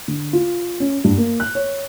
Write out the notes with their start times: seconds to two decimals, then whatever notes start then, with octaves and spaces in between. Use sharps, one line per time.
0.08 D3
0.33 F4
0.80 C#4
1.04 G2
1.18 A#3
1.40 F#6
1.55 C#5